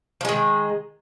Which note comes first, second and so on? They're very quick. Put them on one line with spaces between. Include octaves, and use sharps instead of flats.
F3 G#3 D#3